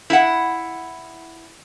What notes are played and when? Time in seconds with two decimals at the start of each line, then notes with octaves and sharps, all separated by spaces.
0.10 E4 F#5